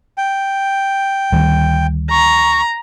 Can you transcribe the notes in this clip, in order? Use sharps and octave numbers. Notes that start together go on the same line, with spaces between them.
G5
D2 D#3 G3
A#5 C#6